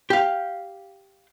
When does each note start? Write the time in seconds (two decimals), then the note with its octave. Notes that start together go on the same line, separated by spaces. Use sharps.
0.10 G4 F5